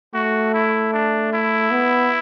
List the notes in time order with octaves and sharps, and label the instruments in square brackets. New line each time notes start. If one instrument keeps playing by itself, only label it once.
[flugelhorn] A3 [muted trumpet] F#4
[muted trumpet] E4
D4
E4
[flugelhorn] B3